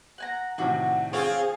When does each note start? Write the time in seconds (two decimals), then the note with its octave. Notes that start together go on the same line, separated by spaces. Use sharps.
0.18 F#5 G#5 A#5
0.58 A2 C3 D#3 D4 F#4
1.13 C4 F4 G#4 C#5 G#5